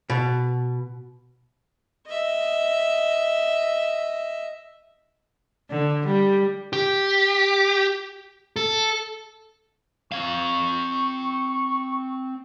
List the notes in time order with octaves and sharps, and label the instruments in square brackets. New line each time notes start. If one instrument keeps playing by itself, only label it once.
[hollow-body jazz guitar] B2
[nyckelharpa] D#5 E5
[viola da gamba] D3
G3
[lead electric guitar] G4
A4
[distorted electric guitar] C4 F5 [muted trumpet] C#6